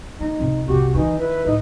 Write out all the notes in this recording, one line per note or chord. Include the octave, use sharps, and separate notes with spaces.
A#3 D#4
F2 C3
C2 C3 F#4 G4
D#3 E3 D#4
E4 B4
A2 D#4